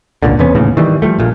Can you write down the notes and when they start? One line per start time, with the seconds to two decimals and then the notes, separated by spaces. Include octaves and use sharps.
0.23 G#1 C#2 A#2 D3
0.39 E2 C3 B3 C#4
0.55 D#2 A2 C#3 E3
0.77 D#3 E3 G3
1.02 F3 G3 A3
1.19 A#1 A#2